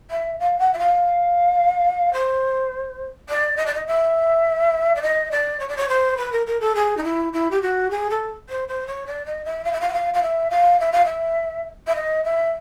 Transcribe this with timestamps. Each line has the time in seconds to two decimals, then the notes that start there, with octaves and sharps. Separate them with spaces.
0.10 E5
0.39 F5
0.58 F#5
0.73 E5
0.78 F5
2.13 C5
3.28 D5
3.57 D#5
3.66 D5
3.74 D#5
3.86 E5
4.95 D5
5.01 D#5
5.31 D5
5.59 C#5
5.68 D5
5.76 C#5
5.88 C5
6.17 B4
6.32 A#4
6.46 A#4
6.60 A4
6.75 G#4
6.97 D#4
7.03 E4
7.33 E4
7.50 G4
7.61 F#4
7.90 G#4
8.10 A4
8.49 C5
8.68 C5
8.86 C#5
9.06 D5
9.25 D#5
9.44 E5
9.64 F5
9.72 E5
9.80 F5
9.88 F#5
9.93 F5
10.13 F5
10.22 E5
10.50 F5
10.79 E5
10.92 F5
11.05 E5
11.86 E5
11.95 D#5
12.24 E5